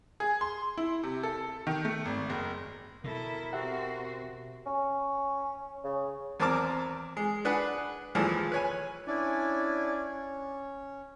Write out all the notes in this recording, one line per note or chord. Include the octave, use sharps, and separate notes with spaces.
G#4
C6
E4
C3
A4
D#3
A3
G#1
F#1
B2 E4 A4 A#4
C4 F#4 G4 E5 F#5
C#4
C#3
E2 C4 A#4 A5 D6 F6
G#3
D4 G#4 B4 F#5
D#2 A#2 E3 F3 G#3 A3
B4 C#5 G#5
C#4 D4 E4 D5 G#5
C#4